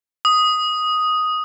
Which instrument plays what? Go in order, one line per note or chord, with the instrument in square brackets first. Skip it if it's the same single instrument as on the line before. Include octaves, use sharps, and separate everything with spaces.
[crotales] D#6